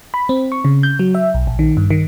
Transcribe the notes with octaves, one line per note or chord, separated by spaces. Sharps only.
B5
C4
C#6
C#3
G6
F#3
E5
B1
A#1
D#3
G2
D#3